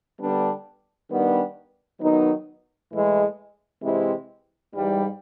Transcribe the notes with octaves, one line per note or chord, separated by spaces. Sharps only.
D3 G3 B3 D4
D#3 G3 B3 D4
D#3 F#3 B3 D#4
A2 E3 G#3
C3 E3 G#3 C4 E4
G#2 E3 G3